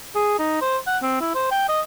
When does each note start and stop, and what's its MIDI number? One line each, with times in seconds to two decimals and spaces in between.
0.16 0.37 68
0.39 0.61 63
0.62 0.78 72
0.87 0.97 78
1.03 1.20 60
1.21 1.31 64
1.35 1.48 72
1.51 1.65 79
1.69 1.81 75